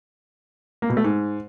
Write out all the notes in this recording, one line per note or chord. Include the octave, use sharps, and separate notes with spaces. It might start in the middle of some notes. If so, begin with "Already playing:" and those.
A#3
B2
A3
G#2